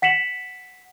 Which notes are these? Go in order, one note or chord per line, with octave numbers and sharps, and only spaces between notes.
F#5 B6 C#7 E7 F#7